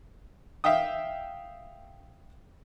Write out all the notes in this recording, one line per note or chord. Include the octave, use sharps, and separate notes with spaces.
E5 F5 G5 D#6